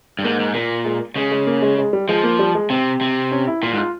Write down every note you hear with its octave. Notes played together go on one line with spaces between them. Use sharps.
G2
G#2 A#3
G#2
A#2 A#3
G#3
C#3 G#3
G#3
A#3
G#3
G#3
G3
F3 G#3
A#3
G3
G#3
C3 C4
C3
C#4
E4
A#2 F4
G#2
F4